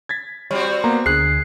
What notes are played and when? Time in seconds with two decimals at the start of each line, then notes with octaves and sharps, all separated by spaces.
0.09 G#6 A6 B6
0.51 G3 C4 F#4 C#5
0.84 A#3 B3 A#5
1.06 D2 D3 G#4 F#6 C7